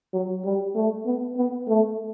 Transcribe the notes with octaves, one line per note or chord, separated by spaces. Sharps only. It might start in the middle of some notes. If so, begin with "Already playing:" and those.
F#3
G3
A3
B3
B3
A3